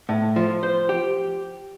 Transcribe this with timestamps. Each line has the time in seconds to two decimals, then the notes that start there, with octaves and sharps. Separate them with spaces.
0.09 A2
0.36 F3
0.63 C5
0.89 G4